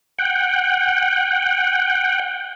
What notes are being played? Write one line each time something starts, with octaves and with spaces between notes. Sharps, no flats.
F#5 G5